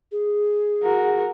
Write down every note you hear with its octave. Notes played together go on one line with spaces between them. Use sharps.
G#4
F#4 A#4